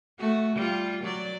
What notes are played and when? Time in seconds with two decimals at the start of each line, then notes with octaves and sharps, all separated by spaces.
0.19 A3 F#4
0.56 G3 F4
1.03 F#3 D5